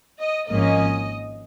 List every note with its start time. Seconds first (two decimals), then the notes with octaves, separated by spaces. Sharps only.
0.20 D#5
0.48 G#1 G#2 F3 A#3 C#4 D#5